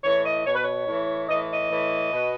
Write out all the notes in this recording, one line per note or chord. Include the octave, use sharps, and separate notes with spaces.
A2 E3 C#5
D#5
B2 C#5
B4
C#5
A2 E3
A2 E3 D#5
D#5
A2 E3
B2